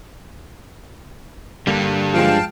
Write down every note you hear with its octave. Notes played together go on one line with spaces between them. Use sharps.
G2 D3 G3 A#3
F3 G#3 F5 G5 A5